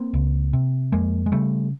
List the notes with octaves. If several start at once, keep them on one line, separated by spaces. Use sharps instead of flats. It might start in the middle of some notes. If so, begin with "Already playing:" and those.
Already playing: A#3 C4
C#2
C3
F2 G#3 A#3
G#3
C#3 G3 A3